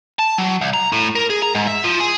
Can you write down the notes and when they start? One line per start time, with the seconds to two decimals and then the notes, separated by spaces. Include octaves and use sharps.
0.19 A5
0.38 F#3
0.61 C2
0.74 A#5
0.92 A2
1.15 A#4
1.30 G#4
1.42 A#5
1.55 G#2
1.67 E5
1.84 F3
2.00 G#4